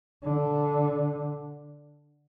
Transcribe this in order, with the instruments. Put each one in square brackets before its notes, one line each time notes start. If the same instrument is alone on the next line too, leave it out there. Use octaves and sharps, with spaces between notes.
[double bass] D3